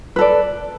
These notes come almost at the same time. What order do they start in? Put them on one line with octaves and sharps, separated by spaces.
B4 A4 D5